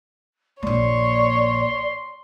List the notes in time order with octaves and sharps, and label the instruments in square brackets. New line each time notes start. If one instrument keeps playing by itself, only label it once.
[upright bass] A#1 A#3 [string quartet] C#5 C#6 [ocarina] D5 [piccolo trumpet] C6